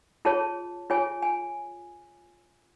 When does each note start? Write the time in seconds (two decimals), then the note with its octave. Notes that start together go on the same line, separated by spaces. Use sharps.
0.25 F4 G#4 C#5 A5
0.90 F4 G#4 C#5 G#5
1.22 G#5